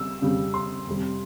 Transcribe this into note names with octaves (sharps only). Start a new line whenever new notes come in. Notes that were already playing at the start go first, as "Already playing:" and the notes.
Already playing: C#3 G3 E6
F2 C#3 G3
C6
F2 C3 G3